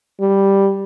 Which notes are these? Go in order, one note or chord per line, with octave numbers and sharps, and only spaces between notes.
G3